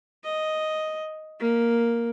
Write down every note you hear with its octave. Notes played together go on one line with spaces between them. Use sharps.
D#5
A#3